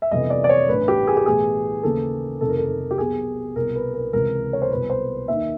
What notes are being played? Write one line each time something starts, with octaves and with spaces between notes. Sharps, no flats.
E5
G1 F2 C3 E3 D#5
D5
D5
C#5
A1 G2 E3 B4
G4
G#4
G4
B1 A2 E3 G#4
D#2 C#3 E3 A4
F1 F2 C3 D#3 A4
A#4
A4
G4
B1 B2 G#4
C2 B2 A#4
B4
A#4
C#2 C3 E3 A#4
C#5
C5
C2 B2 B4
C5
D#2 D#3 E5